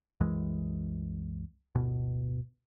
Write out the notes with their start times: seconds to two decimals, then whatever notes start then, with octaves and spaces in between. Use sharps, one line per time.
0.20 C2 F#2 E3 G#3
1.75 D1 G1 B2